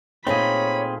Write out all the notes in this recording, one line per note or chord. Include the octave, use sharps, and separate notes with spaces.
A#2 A3 C4 D#4 G#4 C#5 B5